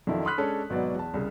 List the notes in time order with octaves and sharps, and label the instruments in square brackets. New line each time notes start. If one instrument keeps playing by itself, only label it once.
[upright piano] F2 D#3 F#3 D4 E4 F4
B5 C6 D#6 F6 F#6 B6
G#3 C#4 D4 A4 C#5
G#1 B2 F#3 B4 D5 D#5
E2 A5
C2 C#3